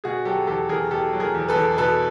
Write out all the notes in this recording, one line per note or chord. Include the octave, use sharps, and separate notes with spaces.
B2 F#4 G#4
F#3 G4 A4
E2 G4 A4
E2 G#4 A#4
B2 G4 A4
F#3
G#4 A#4
E2
A4 B4
E2
B2 A4 B4